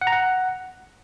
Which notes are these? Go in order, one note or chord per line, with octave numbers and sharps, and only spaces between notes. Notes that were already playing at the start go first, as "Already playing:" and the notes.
F#5
A#5
F#5